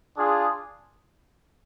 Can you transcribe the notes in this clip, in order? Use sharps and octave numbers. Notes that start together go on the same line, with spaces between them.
D4 F4 G#4